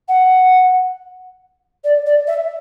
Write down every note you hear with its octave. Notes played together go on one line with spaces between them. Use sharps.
F#5
D5
D5
E5